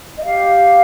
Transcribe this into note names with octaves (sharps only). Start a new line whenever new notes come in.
D#5
G4 F5